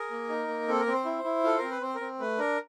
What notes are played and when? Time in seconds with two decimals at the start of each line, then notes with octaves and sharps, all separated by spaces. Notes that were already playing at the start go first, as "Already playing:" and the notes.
Already playing: G#4 A#4
0.11 A#3
0.29 D#4
0.48 A#3
0.68 C4 A4
0.79 A#4
0.86 C4
0.93 C5
1.05 E4
1.24 E4
1.44 F4 A4
1.58 C4 A#4
1.71 B4
1.81 C4 C5
1.95 A#4
2.00 C4
2.20 A3 B4
2.38 D4 A#4